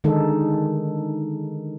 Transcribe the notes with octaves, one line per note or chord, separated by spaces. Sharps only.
D3 D#3 G#3 D#4 G#4 A4